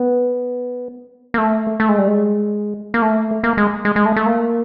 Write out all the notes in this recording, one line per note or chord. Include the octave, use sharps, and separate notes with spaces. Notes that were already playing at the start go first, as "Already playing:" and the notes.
Already playing: B3
A#3
A3
A3
G#3
G3
G#3
A#3
A3
A#3
G#3
G#3
G#3
A3
A3
A#3